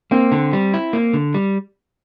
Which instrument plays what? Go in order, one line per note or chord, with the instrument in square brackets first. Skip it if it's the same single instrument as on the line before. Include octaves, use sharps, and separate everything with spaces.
[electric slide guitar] A#3 [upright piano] C4
[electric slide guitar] D3
G3
E4
A#3
D3
G3